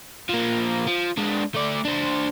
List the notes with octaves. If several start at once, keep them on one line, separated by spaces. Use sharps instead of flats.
F3 A#3
F3
G#3 D4
A3 D5
D4 C5